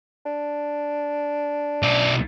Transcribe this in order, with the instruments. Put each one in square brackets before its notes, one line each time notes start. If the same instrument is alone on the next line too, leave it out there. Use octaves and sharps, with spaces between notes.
[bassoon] D4
[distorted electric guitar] B1 D5